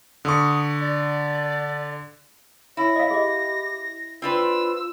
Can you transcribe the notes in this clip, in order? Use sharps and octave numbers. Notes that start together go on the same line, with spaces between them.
D3 C#6 D#6
D5
E4 C#5 A#6
C#5 D#5 F5
G4 G#4 D#5
C4 D4 F4 B4 E6